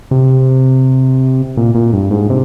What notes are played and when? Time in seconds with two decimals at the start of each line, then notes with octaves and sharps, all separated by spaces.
0.11 C3
1.57 A#2
1.75 A#2
1.93 G2
2.11 G#2
2.30 C3